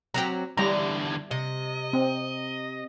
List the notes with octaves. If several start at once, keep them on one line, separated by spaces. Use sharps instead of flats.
F#3 C4 G4 A#5
E2 D3 G3 E4 A#5
C3 D#5
C4